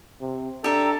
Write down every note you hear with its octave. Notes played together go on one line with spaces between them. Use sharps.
C3
D4 G4 A4 E5 A#5